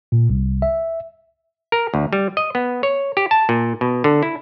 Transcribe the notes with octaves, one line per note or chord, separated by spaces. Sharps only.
A#2
C2
E5
A#4
D2
G3
D#5
B3
C#5
G4
A5
A#2
B2
D3
E4